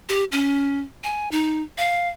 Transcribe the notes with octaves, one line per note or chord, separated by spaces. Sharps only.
G4
C#4
G#5
D#4
F5